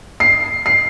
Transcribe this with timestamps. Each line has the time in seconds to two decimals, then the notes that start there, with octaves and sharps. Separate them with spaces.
0.20 C7
0.66 C7